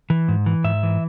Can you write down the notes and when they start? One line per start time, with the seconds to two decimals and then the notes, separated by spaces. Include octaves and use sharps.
0.10 E3
0.28 G#2
0.46 E3
0.64 G#2 E5
0.83 E3